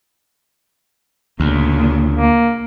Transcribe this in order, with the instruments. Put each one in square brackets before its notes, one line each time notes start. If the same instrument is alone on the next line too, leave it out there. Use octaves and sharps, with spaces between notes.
[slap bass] D2 [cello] A#2 C#3
[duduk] A#3